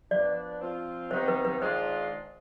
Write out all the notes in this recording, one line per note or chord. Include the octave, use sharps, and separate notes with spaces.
F3 B3 D4 D5
F3 C4 F4
C3 D#3 B3 D#4 C5
B4
B4
D#3 G#3 D4 F4 C5